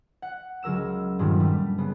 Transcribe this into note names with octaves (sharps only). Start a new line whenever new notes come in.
F#5
C#2 F#3 A#4 E6 E7
G2 A#2 D#3 F3 G3 G#3
G3 A3
C#3 B3